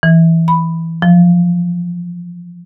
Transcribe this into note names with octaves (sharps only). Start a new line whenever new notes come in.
E3
B5
F3